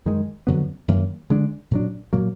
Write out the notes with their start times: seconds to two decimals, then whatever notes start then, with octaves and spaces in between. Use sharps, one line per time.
0.05 F#2 D#3 G#3
0.47 F2 D3 F#3 B3
0.88 F#2 D#3 A#3
1.30 D3 G#3 D4
1.71 A#2 F#3 D4
2.13 A#2 F#3 A#3